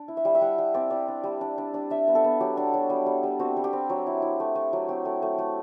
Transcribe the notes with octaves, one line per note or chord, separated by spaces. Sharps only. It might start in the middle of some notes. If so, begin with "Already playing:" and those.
Already playing: D4
E4
E5
G3
E5
G3 F#5
G3
C4 D5
G3 D5
D4
G3
D4
D4
D4
D4 E5
B3
A4
B3
F#3 G4
D4
F#3
G3
G3
G3
C4 F#4
G3
G4
C4
F#3
E4
E4
A3
A3
F#3
C4 G4
A3
A3
A3